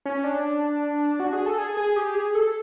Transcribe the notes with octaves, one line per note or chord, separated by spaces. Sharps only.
C#4
D4
F#4
G#4
A4
G#4
G#4
G4
G#4
A4